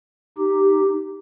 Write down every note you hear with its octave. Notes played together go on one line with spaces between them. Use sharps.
D#4 G4